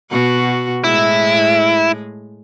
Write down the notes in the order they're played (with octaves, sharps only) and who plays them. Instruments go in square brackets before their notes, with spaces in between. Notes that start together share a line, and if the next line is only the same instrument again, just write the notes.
[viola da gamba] B2 F#4
[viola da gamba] A2 G#3 [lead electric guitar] E4